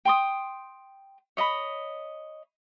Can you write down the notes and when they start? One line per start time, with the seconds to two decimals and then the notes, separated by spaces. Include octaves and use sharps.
0.05 G5 C6 D#6
1.37 C#5 D#5 E5 B5